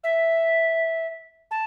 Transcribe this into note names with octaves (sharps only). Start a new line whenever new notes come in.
E5
A5